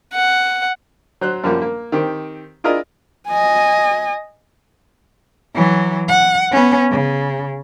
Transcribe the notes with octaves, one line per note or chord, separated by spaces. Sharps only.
F#5
F#3 C5 F#6
F#2 F3 G3 A#3
A#3
D#3 C4 G4
E4 F4 G#4 A#4 D5 D#5
D#5 G#5
E3 F#3
F#5
B3 C#4
C#3